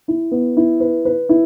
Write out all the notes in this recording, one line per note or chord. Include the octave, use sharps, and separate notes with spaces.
E4
B3
E4
B4
B4
E4